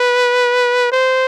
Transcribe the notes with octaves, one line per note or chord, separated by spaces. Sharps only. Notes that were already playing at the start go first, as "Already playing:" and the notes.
Already playing: B4
C5